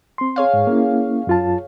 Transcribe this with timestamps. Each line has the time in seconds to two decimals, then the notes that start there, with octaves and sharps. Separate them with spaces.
0.18 C4 C6
0.36 G#4 C#5 F5
0.54 G#2
0.67 A#3 C#4 E4
1.27 F#2 F4 A5